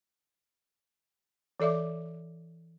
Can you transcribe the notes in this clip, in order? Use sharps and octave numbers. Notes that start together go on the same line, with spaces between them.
E3 A4 D5 E5 D6